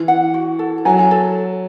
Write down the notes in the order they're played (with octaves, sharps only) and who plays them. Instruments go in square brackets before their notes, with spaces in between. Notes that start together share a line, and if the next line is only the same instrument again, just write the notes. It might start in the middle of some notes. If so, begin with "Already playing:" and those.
Already playing: [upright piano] E3
[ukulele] F#5
F#4
A4
[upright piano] F#3 [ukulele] G#5
[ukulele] A4